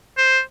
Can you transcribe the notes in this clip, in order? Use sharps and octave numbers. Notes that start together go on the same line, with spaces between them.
C5